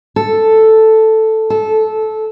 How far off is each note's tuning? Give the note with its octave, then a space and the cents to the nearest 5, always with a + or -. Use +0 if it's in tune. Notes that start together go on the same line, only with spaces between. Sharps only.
A4 +0
A4 -15